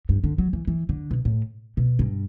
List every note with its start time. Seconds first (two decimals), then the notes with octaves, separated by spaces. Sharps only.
0.09 G2
0.24 D3
0.38 F#3
0.53 E3
0.67 E3
0.89 D3
1.11 B2
1.25 A2
1.77 B2
1.99 G2